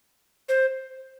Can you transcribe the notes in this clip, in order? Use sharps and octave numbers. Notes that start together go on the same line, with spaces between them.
C5